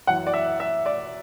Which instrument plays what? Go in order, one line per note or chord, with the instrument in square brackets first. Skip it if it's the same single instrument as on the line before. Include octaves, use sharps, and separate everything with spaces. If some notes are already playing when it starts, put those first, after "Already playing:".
[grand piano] F#2 E3 F#5
D5
E5
E5
D5